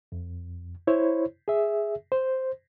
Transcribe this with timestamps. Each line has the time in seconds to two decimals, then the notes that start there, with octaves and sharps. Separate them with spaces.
0.12 F2
0.87 E4 C5 C#5
1.48 G#4 E5
2.12 C5